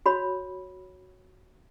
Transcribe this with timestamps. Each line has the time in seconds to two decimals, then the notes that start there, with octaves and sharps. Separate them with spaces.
0.06 F#4 C#5 B5